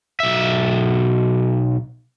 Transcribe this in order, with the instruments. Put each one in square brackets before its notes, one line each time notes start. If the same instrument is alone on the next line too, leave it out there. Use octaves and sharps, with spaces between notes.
[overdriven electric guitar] B1 E5